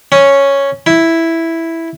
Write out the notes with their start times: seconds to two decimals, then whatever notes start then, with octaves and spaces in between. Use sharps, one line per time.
0.12 C#4
0.86 E4